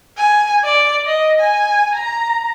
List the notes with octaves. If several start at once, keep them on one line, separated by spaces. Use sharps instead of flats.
G#5
D5
D#5
G#5
A#5